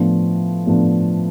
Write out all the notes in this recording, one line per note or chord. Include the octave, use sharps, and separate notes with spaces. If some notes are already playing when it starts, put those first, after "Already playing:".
Already playing: A2 F3 B3 D4
A2 F3 B3 D4